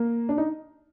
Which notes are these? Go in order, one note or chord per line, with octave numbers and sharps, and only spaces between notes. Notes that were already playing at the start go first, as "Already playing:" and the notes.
Already playing: A#3
D4
D#4